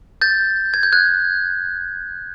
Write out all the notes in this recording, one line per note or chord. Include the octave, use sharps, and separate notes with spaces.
G6 A6
G#6
G6
F#6 G#6